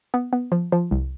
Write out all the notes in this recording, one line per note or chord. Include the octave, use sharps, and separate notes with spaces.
B3
B3
F3
F3
C2